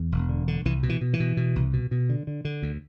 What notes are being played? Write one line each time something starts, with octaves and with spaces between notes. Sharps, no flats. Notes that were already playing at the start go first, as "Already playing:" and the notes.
Already playing: E2
E1
D3
D3
C2 E3
B2
E3
B2
E3
B2
B2
C2
B2
B2
D3
D3
D3
D2